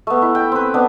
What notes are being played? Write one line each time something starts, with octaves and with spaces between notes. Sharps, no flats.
A3 B3
E4
G5
C4 B4
B3 D4